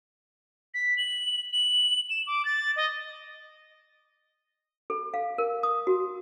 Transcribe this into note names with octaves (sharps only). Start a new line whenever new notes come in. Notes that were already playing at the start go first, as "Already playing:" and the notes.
B6
F#7
F#7
E7
D6
A6
D#5
A4
F5
A#4
D#6
F#4